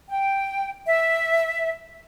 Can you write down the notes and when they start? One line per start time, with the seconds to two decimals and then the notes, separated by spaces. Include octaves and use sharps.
0.09 G5
0.86 E5